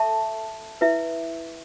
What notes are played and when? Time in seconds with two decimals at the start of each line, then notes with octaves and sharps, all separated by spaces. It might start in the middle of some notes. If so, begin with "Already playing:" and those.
Already playing: A4 E5 A5 C#6
0.81 E4 B4 E5